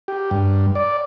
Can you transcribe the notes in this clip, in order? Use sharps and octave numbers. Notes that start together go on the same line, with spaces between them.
G4
G2
D5